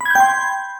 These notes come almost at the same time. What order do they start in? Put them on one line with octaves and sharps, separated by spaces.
B5 G#6 G6 G5 C6